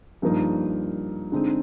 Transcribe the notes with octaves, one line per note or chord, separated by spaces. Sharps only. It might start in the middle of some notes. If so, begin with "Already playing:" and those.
G2 F3 A#3 D#4
D3 G#3 C4 D#4